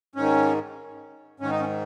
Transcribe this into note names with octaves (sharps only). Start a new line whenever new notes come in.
G#2 D#3 C#4
G#2 D#3 C#4
D#4
C#4